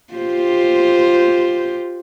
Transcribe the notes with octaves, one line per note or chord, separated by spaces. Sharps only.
F4 G4 C5